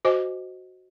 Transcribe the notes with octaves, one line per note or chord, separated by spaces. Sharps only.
F#4 C5 D#5 G#5 D6